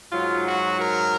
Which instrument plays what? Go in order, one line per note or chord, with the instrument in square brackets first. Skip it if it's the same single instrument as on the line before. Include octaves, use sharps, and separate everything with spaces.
[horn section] G#2 F#3 F4
F#4
A#4